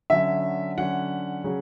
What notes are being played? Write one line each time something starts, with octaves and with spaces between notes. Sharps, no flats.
D3 F#3 C#4 E5
D3 F#3 C#4 F#5
C#3 F#3 C#4